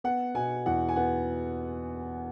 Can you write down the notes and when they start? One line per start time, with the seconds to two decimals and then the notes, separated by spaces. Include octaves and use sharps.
0.04 B3 F#5
0.35 B2 G#5
0.66 E2 F#5
0.89 G#5
0.96 B3 F#5